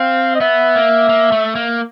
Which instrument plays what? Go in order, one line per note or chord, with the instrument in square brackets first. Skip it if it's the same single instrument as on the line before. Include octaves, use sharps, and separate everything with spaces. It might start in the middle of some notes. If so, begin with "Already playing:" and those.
Already playing: [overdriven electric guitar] C4 [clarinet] F5
[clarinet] D#5
[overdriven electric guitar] B3 [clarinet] E5
[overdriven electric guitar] A#3
A#3
A3
A#3